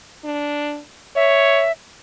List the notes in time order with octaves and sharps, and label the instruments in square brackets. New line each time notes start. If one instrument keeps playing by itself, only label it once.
[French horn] D4
[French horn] C#5 [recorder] E5